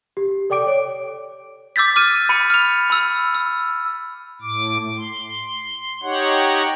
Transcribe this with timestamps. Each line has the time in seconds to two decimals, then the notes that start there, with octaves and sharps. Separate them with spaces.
0.17 G4
0.50 A4 D5 G5 D6 D7
0.67 C#5
1.76 D6 E6 G6 A6 B6
1.96 D6 F6 D#7
2.29 B5 C#7 D#7
2.50 F6 F7
2.90 B5 E6
3.35 E6
4.42 A2 D6
4.97 C6
6.03 D#4 G4 C#5 F#5